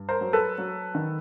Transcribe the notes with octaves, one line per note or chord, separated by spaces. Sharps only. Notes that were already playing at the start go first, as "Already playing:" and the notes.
Already playing: G2
A#4 C5
F#3
A4 B4
F#3
D#3